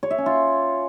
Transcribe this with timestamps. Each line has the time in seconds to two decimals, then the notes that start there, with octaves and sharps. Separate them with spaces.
0.03 C#5
0.11 E5
0.18 C#4
0.26 F4